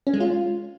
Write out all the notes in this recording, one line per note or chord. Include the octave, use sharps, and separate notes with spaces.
C#4
G#3
F4